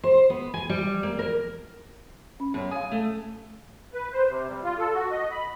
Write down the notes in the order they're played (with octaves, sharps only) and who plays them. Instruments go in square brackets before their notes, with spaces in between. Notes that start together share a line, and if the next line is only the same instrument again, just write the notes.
[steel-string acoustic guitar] C5
B3
G#5
G3
A#3
A#4
[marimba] C#4 B5
[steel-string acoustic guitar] F#2 [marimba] B3 C#5
[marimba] F5 D#6 [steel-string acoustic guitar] G#5
[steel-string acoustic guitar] A3
[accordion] B4
C5
C3
G3
F4
A4
F#4
D#5
B5